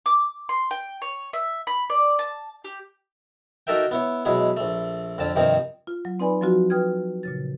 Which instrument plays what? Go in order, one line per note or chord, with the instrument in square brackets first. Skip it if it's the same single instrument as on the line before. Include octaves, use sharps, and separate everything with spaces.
[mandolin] D6
C6
G5
C#5
E5
B5
D5
A5
G4
[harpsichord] D#4 F#4 A4 A#4 E5 G5
B3 E4 C#5
B2 F#3 G#3 E4 G#4
A#1 A3
F2 D3 A5
G2 C3 D#3 F3 C4 D#4
[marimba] F4
F#3
C4 D#4 B4 D5 G#5 B5
F3 F#3 C4 F4 F#4
B4 G5 D#6 F6 G#6
A#2 C#3 A6